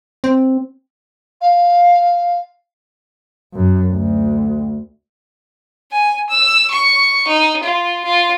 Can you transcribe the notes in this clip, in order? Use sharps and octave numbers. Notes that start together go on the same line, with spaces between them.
C4
F5
F#2
D2
G#5
E6
C#6
D#4
F4
F4